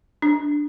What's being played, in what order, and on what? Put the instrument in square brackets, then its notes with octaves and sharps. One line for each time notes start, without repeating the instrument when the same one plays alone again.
[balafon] D4